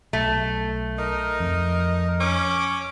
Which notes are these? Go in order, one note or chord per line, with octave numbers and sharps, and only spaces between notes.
B1 A3
D#4 A#4
F2
C#4 D6